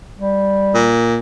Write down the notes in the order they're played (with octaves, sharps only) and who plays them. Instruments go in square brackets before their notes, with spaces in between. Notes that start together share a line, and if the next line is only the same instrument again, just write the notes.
[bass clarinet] G3
[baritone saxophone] A#2